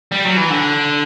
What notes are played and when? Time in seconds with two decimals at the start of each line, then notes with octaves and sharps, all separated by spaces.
0.12 G3
0.25 F#3
0.37 E3
0.50 D3